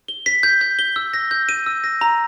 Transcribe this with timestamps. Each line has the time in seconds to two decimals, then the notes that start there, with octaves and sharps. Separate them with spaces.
0.08 G7
0.26 B6
0.43 G6
0.61 G6
0.79 G7
0.96 E6
1.14 A#6
1.31 G6
1.49 D#7
1.66 E6
1.84 A#6
2.01 A#5